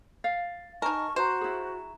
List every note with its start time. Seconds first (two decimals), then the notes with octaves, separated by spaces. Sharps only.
0.24 F5 A6
0.82 D#4 A#4 G#5 A5 C#6
1.16 F#4 C5 A#5 C#6 E7
1.41 E4 G#4